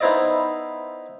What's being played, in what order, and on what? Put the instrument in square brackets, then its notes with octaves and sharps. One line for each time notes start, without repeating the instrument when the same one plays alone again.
[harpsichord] B3 D#4 E4 C5 D5 D#5